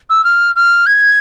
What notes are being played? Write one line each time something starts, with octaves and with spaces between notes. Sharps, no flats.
E6
F6
F6
G#6